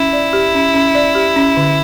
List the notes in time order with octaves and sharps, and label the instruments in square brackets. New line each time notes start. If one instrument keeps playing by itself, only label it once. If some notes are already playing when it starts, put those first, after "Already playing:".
Already playing: [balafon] C#4 [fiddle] E4
[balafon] D5
G4
C#4
C#4
D5
G4
C#4
D3